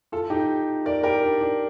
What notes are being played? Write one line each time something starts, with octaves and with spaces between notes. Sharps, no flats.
F4 A4
D#4 G4
A#4 D5
G4 A#4
D4
D4